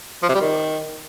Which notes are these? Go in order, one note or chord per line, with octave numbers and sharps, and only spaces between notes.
F3
C3
G3
D#3